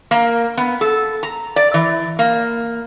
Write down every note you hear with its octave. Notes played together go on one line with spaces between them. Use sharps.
A#3
B3
A4
A#5
D5
E3
A#3